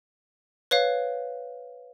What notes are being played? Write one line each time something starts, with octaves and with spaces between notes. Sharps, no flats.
B4 C#5 F5